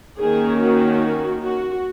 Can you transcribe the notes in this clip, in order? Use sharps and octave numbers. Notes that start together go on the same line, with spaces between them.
D#3 A#3 C#4 G#4
F#4
F#4